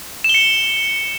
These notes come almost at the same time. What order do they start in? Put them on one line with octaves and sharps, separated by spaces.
E7 G7 C#7